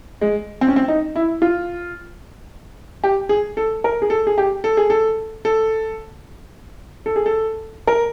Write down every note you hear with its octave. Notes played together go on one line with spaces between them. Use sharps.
G#3
C4
C#4
C4
D#4
E4
F4
G4
G#4
A4
A#4
G#4
A4
G#4
G4
A4
G#4
A4
A4
A4
G#4
A4
A#4